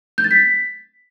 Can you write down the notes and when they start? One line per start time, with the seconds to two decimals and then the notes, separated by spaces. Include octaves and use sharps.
0.18 G6
0.24 A6
0.31 B6